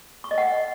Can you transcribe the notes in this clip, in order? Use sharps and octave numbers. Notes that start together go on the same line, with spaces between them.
C#6
D#5
F#5